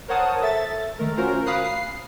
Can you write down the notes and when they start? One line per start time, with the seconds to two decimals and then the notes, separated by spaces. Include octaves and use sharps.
0.08 A#4 C5 C#5 F#5 A5 D#6
0.42 A4 E5 A6
0.99 D#3 A3 A#4
1.17 C#4 F4 F#4 A#4 C5
1.46 F5 B5 D#6 F#6 C7
1.64 C7